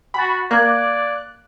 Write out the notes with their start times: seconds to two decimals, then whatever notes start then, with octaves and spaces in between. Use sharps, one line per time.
0.14 F#4 G#5 B5 A6
0.51 A#3 D5 F5 D6 F#6 G#6